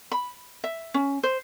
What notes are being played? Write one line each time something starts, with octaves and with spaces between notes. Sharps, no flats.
B5
E5
C#4
C5